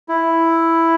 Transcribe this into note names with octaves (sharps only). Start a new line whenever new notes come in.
E4